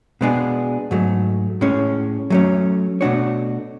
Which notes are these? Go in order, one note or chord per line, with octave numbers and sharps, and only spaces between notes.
B2 G#3 B3 D4 G#4
G#2 F#3 A3
A2 G#3 C#4
F#3 A3 C#4
B2 A3 D4 F#4 C#5